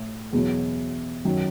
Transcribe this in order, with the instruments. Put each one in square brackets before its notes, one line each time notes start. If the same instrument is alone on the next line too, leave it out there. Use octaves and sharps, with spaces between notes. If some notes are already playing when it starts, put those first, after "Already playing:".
Already playing: [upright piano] A2
E2 B2 F#3
F#2 D#3 F#3